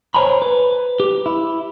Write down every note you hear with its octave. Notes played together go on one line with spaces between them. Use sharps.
C5 C#5 G#5 A#5 B5
B4
G4
E4